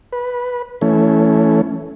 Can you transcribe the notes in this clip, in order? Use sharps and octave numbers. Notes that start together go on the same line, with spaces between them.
B4
E3 A3 C#4